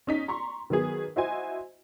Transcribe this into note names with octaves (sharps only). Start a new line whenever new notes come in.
C#4 D#4 B6
A#5 C6 C#6
D#3 F#3 B3 G#4
E4 F#4 C5 D#5 G#5